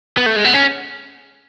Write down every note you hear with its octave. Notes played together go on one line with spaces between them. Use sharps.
B3
A3
G#3
B3
C#4